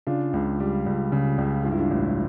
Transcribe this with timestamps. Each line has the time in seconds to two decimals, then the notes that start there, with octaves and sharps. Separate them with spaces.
0.07 C#3 D4 F4
0.33 C#2
0.60 G3
0.86 C#2
1.12 C#3
1.38 C#2
1.64 G2 F4
1.71 E4
1.78 D4 F4
1.91 A1